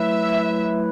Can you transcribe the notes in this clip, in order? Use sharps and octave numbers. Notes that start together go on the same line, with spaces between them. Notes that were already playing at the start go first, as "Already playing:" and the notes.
Already playing: F#3 A3 E4 B4 E5